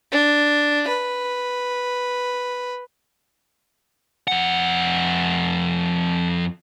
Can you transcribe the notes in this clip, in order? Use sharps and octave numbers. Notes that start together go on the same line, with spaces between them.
D4
B4
F2 F#5